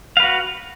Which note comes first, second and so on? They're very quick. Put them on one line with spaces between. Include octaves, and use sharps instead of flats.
F5 B4 F#4